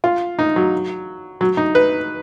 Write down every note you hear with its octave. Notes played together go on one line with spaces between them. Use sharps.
F4
D#4
F#3
F#3
D#4
B4